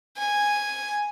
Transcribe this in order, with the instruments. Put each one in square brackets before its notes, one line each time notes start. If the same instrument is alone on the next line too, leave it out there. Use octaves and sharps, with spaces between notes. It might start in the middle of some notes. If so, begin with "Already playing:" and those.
[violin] G#5